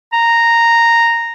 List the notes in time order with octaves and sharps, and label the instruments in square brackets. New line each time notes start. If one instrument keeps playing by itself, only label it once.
[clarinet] A#5